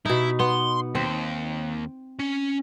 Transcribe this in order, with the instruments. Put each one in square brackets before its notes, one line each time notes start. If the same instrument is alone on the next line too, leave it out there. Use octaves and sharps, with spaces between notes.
[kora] B2 D#4 [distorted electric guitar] E4
[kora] B3 [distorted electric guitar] C6
[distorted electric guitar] D#2 [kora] C4
[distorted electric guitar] C#4